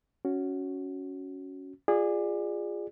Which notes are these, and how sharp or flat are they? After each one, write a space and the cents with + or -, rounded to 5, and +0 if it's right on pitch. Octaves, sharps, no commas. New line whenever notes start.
C#4 +5 F#4 +0
F4 +0 G#4 -20 D5 +20